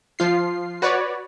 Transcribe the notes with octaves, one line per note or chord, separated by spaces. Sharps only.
F3 F4 C7
F#4 B4 C#5 D5